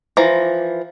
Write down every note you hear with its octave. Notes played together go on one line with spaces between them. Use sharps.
E3 F3 A#5